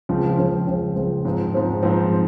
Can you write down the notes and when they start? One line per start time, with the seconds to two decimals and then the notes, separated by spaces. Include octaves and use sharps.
0.09 C#2 C#3 F3 C4
0.39 C#2 C#3 F3 C4
0.67 C#2 C#3 F3 C4
0.96 C#2 C#3 F3 C4
1.25 G#2 F3 C4
1.54 G#2 F3 C4
1.83 G#2 F3 C4